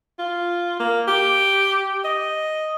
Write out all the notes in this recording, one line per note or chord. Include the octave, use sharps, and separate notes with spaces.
F4
A#3
G4
D#5